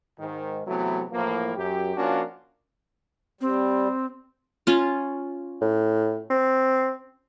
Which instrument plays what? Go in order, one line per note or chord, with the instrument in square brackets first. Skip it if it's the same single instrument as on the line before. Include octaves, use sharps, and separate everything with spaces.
[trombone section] G#2 D#3
C3 E3 F#3 A3 B3
A2 E3 F3 A#3
F#2 G4
F3 A#3 C#4 D4 F4 F#4
[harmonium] G3 [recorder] C4
[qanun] C#4 F4
[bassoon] A2
C4